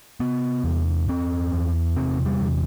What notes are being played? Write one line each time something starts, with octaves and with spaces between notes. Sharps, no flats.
C3 B3
E2
E2 C4
E2
C3 C4
G3
E2